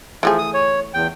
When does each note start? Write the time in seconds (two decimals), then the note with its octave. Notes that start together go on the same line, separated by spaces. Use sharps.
0.23 E3 F3 A3 G#4
0.38 D#6
0.54 C#5
0.94 E2 G5